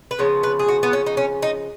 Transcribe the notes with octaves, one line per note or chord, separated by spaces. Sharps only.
B4
C#3 F3 B3 C#5
B4
G#4
F#4
B3
C#4
D#4
C#4
D#4